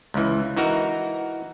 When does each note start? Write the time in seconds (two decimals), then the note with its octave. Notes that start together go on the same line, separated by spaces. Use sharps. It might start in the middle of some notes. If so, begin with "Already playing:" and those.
0.14 C#2 E3
0.57 E3 D#4 F#4 A#4